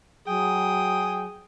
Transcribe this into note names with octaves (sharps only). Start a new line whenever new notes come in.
F#3 G#4 G5 D#6